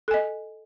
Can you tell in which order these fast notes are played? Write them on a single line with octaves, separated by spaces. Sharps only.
A4 G#5 D#5